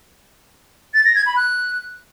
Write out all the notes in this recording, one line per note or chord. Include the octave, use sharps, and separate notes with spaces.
A6
A#6
G#6
B5
F#6